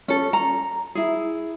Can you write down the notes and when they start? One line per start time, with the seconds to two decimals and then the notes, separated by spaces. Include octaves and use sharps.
0.08 C#4 A4
0.33 A#5
0.95 E4 G#4